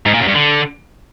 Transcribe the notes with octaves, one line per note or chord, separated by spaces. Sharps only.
G#2
A#2
F#2
G2
D3